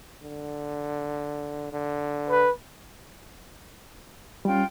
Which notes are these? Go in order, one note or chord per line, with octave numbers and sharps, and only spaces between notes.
D3
D3
B4
G3 C#4 F4 G5